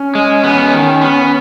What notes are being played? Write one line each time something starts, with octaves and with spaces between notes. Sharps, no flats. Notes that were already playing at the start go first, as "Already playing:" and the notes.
Already playing: C#4
G#3
B3
D#3
B3